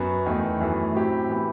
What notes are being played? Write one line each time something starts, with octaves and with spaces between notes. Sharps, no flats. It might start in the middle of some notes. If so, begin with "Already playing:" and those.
Already playing: F#2 F#3 B3 F#4
E2 D#3 A3
F#2 E3 A3
A2 F#3 C4 E4 G4
A2 E3 B3